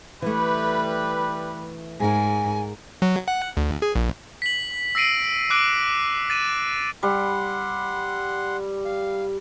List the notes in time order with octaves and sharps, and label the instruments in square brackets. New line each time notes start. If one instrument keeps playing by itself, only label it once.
[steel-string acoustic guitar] E3 A3 [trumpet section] G3 B4
[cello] G#2 [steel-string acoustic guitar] G#4 A#4 [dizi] G#5
[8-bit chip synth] F#3
F#5
D2
G#4
A#1
[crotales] B6 F#7
E6 A#6 C7 D7 D#7
D6 F#6 D7 D#7
A6 D#7 E7
[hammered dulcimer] G3 [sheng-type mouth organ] F#5 C6
[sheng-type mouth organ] F5